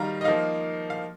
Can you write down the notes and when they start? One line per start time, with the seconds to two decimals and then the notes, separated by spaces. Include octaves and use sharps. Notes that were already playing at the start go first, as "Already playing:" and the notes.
Already playing: D#3 G3 D#4 F5 A#5
0.21 D#5
0.24 F3 A#3 D#4 F5
0.90 F5